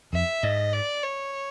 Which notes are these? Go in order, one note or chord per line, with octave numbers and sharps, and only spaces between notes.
F2 E5
G#2 D#5
D5
C#5